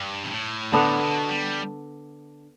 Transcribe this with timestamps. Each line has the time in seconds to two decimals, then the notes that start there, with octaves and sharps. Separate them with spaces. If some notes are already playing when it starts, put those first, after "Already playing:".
Already playing: G2
0.24 B2
0.31 A2
0.72 A2 D3 B3 D4 A4
1.01 B2
1.29 G3